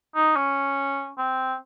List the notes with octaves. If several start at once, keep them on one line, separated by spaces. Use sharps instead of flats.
D#4
C#4
C4